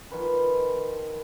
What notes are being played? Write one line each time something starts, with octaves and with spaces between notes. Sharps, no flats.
D#3 F3 B4 G#5